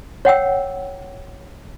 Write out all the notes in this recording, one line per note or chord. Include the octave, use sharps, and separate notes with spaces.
C#5 F#5 G5 E6